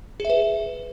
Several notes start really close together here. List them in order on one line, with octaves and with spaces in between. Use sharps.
G#4 E5 B4